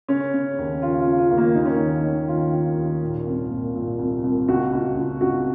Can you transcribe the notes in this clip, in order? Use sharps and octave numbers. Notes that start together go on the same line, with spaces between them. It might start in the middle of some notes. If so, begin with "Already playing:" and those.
C#3 C#4
C#3
D#2
C#3 F4
F4
C#3
F4
D#2
A#3
D#2 D#4
C#4
D#3 D#4
D#3
D#3 F4
D#3
D#2
A#2
C2
A#2
A#2
C2
C2
C#2 F#4
C#2
C#2
C#2 F#4